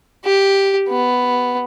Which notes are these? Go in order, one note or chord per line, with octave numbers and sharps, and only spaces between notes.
G4
B3